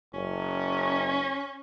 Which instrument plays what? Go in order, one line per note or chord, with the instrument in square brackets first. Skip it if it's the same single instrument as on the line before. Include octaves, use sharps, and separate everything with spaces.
[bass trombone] F#1 [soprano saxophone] C#4